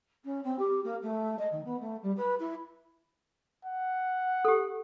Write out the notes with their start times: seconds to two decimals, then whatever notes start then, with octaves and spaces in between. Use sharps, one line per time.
0.24 C#4
0.43 C4
0.58 G4
0.84 A#3
1.02 A3
1.38 D#5
1.51 D#3
1.64 B3
1.79 A3
2.02 G3
2.16 B4
2.39 E4
3.65 F#5
4.45 G4 A4